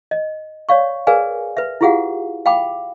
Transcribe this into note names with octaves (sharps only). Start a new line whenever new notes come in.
D#5
C#5 D5 F5 C#6
G#4 A#4 B4 D5 F5 G#5
B4 E5
E4 F4 G4 G#4 F5 F#5
F5 G5 B5 D6